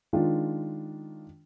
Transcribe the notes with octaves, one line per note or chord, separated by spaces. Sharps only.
D#3 G#3 D4 F4